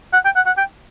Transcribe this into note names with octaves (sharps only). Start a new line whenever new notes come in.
F#5
G5
F#5
F#5
G5